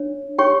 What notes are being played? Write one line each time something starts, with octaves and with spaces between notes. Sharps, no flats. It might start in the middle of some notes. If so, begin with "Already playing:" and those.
Already playing: D4 C#5
G4 C#5 G5 C#6